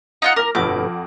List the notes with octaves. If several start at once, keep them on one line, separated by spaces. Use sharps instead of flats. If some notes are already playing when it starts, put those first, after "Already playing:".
D#4 F4 F#5
A#4 D6 F6 A#6
G1 F2 B2 A3 F#5 D6